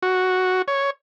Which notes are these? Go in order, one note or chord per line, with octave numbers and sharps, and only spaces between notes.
F#4
C#5